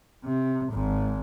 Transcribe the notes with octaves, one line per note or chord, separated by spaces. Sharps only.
C3
G#1 G#2